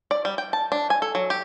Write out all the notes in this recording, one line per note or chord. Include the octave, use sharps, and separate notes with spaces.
D5
G3
G5
A5
D4
G#5
A4
F#3
G4